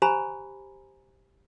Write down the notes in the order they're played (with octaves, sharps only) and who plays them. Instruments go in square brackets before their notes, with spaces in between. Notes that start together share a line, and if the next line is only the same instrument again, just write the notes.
[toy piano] G4 C5 G#5 A#5 B5